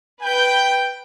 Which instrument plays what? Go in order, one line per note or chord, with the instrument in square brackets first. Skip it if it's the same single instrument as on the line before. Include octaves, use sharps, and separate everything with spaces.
[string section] B4 G6 [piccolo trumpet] G5